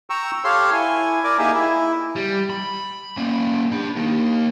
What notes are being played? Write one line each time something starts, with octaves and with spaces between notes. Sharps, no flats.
G5 A#5 C#6 E6
G4 A4 C#5 F5 C6
E4 G#5
A#4 D5 G#5 D6
A#3 D#4 G4 G#4 E5 G#5
E4
G3
B5
A#3 C#4
D4 B5
A#3 D#4